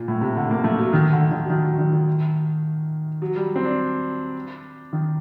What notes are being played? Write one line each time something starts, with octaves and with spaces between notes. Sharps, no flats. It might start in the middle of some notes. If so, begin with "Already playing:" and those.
Already playing: A#2
A2
C3
D3
A#3
A3
F#3
D#3
D3
D#3
F#3
D#3
F#3
D#3
D#3
F#3
G3
C4
D4
D#3